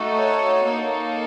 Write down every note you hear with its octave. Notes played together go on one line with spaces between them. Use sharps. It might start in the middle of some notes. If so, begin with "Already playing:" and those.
Already playing: A3 D#4 F#4 A4
C#5
A#3 D#4 A4